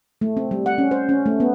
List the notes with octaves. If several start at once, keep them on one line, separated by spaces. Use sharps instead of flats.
A3
C4
G3
F#5
C#4
C5
C#4
A3
B3